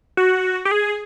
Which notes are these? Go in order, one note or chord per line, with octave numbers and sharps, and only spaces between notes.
F#4
G4
G#4